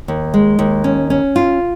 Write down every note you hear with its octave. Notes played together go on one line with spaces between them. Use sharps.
D#2
G#3
D#2
C#4
C#4
F4